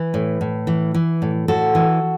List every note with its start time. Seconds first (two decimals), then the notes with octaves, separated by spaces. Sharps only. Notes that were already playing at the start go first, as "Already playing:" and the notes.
Already playing: E3 B4
0.14 A2
0.41 A2
0.67 E3
0.95 E3
1.22 A2
1.48 A2 F#4 A4
1.75 E3